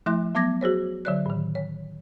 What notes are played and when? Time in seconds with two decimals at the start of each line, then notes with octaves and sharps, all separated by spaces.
0.06 F3 A3 E4 E5 C6 F#6
0.35 F#3 B3 D6 G#6 A#6
0.61 F#4 G#4 C5 C#5
1.05 D3 F#3 C#5 D5 F#6
1.26 A2 D#3
1.55 C#5